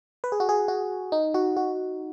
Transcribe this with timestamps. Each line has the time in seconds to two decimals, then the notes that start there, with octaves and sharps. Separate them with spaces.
0.24 B4
0.32 G#4
0.40 F#4
0.49 G#4
0.68 F#4
1.12 D#4
1.34 F#4
1.57 F#4